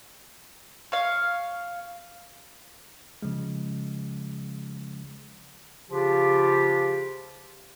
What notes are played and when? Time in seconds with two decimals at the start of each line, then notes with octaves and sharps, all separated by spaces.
0.92 C#5 F5
3.22 C#3 F3 G#3
5.90 C#3 F3 D4 F4 G4